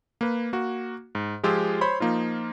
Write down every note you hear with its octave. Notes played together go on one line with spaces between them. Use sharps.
A#3 B4
A#3 F#4
G#2
F3 G#3 F4 G4 G#4 E6
C5 C#5 B5 C6
F3 A#3 D#4 F4